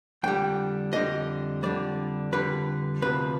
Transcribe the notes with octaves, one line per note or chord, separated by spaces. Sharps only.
F2 D3 G3 G5
F2 D3 G3 D#5
F2 D3 G3 D5
F2 D3 G3 B4
D2 C3 F3 B4